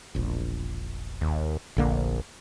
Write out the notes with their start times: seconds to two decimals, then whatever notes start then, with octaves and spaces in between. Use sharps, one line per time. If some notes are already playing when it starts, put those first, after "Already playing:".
0.15 E1 A#1
1.21 D#2
1.77 F1 A#1 D3 A#3